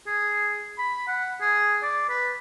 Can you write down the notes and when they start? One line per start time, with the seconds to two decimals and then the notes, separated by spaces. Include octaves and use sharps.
0.07 G#4
0.78 B5
1.08 F#5
1.41 G#4
1.83 D5
2.09 B4